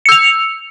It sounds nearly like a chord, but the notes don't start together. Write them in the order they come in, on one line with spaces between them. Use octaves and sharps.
C#7 E6 F7